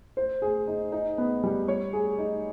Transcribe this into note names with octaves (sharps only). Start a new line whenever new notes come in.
C5
G#4
D#4
D#4
B3
G3
C#5
G#4
D#4